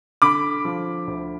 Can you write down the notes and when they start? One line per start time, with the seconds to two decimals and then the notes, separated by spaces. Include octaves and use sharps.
0.22 D3 B5 D6
0.65 F3
1.07 D2